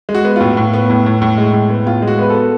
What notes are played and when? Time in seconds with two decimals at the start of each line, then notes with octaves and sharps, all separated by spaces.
0.09 G#3
0.15 F#4
0.25 B3
0.36 A2 F4
0.57 A2
0.73 B3
0.90 A2
1.06 A2
1.22 A2
1.38 G#3
1.53 A2
1.70 B3
1.86 A2 F4
2.02 G#3
2.08 F#4
2.19 B3 B4
2.30 B3 A4